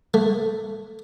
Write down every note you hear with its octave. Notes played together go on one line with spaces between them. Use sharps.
A3